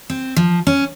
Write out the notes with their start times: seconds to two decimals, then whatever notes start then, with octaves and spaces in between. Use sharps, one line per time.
0.10 C4
0.36 F3
0.67 C#4